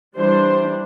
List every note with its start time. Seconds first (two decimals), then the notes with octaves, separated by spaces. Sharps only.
0.16 E3 G3 D4 C5